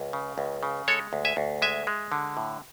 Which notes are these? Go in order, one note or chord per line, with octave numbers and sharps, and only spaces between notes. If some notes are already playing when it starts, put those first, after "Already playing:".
Already playing: C#2
C#3
C#2
C#3
G#3 A4 C#5
D2
E5 G#5
D2
G#3 E5 G#5
G#3
D3
A2